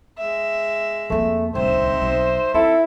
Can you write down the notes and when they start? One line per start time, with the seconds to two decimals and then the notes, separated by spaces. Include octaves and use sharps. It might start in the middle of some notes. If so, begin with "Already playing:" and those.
0.18 G#3 E5
1.10 F2 A3 A#3
1.55 D1 C2 C4 D#4 C5 E5
2.02 B1
2.54 C4 E4 A4